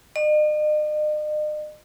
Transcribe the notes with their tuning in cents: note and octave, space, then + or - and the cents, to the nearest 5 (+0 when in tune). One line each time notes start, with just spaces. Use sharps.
D#5 -45